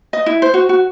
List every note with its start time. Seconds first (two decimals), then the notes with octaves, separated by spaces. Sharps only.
0.13 D#5
0.26 E4
0.42 C5
0.54 F#4
0.69 F#4